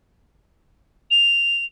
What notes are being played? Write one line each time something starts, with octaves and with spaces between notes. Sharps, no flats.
F7